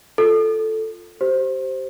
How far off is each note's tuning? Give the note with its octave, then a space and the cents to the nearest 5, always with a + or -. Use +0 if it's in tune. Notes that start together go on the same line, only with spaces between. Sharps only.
F4 +0 A4 +0
G4 -25 C5 +0